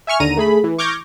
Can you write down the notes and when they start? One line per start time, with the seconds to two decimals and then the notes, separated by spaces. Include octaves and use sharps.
0.07 E5 G#5 C#6 F6
0.20 D#2 D3 A#5 D#7
0.37 A3 G#4 B5
0.64 E3
0.78 C#6 D6 F6 G6 G#6 A#6